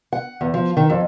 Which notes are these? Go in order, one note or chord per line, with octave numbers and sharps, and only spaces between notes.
F#5
E2
F3
D#3
F2